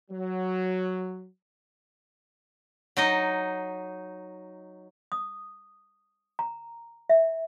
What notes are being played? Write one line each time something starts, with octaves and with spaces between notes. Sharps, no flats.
F#3
F#3 D#4 D#5
D#6
A#5
E5